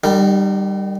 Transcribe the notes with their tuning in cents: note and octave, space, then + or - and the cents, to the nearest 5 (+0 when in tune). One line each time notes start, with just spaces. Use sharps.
D#3 -35 G3 +0